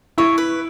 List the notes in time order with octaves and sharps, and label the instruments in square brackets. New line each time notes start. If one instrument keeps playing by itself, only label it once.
[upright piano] E4 [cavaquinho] C#5
[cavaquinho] B4